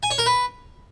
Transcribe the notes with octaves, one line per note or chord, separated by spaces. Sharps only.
G#5
C#5
A#4
B4